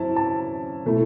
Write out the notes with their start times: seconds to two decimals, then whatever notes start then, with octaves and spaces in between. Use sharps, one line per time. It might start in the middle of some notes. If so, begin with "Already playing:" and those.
Already playing: F#2 F#3 C4 E4 A5
0.16 A5
0.85 B2 A3 E4